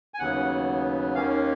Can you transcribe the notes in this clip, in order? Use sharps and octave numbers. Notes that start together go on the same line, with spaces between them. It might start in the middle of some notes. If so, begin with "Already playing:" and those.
G#5
D#2 C#3 F#3 B3 F#5
D#2 D#3 A#3 C#4 F5